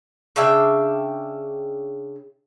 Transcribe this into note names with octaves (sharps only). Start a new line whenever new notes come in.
C#3 D4 E5 G5